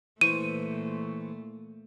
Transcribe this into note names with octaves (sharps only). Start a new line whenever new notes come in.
A#2 E3 A3 C5 C#6 D#7